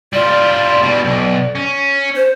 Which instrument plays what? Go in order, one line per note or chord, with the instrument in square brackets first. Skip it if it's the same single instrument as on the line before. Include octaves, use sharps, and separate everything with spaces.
[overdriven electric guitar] G3 F4 [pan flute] D5
[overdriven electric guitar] B2 G3
B1
C#4
[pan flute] C5